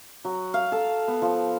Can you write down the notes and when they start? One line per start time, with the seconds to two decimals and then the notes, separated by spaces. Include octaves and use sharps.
0.25 F#3
0.54 F5
0.72 A4
1.08 B3
1.22 F3